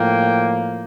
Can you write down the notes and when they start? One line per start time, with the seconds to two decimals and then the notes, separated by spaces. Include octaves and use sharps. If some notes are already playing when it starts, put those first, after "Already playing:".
Already playing: A2 F3 A#3 G5